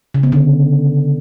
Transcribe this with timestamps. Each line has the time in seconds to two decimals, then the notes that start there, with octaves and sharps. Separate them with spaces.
0.14 C#3
0.23 B3
0.32 D3